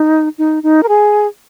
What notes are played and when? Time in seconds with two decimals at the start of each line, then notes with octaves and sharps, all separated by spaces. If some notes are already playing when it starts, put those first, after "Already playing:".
Already playing: D#4
0.38 D#4
0.63 D#4
0.83 A#4
0.88 G#4